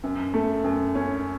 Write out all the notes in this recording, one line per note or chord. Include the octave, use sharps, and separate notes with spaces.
F#2
A3
F#2
C#4